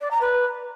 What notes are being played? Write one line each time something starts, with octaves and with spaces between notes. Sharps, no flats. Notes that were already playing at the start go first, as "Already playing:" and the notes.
D5
A#5
B4